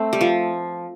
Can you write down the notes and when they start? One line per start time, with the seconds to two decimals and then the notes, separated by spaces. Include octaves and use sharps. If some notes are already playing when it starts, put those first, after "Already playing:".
Already playing: A3 C4
0.13 G3
0.21 F3